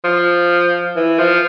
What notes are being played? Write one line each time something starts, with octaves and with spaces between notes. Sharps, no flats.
F3
E3
F3